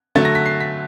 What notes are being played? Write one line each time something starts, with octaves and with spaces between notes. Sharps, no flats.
D3 F#3 A3 A6
A#6
B6
C7
B6